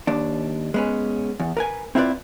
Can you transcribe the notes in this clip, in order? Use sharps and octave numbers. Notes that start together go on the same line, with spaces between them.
D#2 D4
G#3 B3 C#4
E2
A#4 B4 G#5
C4 E4 F4 A#4 B4 D5